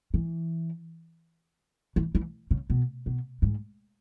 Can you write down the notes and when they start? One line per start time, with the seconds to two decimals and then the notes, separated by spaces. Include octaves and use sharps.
0.14 E3
1.96 E3
2.15 E3
2.51 C#3
2.70 B2
3.06 B2
3.42 G#2